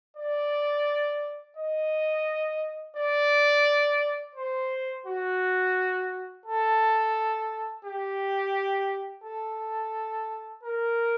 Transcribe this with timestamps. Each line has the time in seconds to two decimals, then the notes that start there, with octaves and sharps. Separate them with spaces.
0.17 D5
1.57 D#5
2.97 D5
4.35 C5
5.06 F#4
6.46 A4
7.85 G4
9.24 A4
10.63 A#4